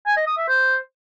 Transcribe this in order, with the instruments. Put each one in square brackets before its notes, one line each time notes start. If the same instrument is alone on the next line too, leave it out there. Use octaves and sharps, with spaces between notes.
[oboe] G#5
D#5
D#6
E5
C5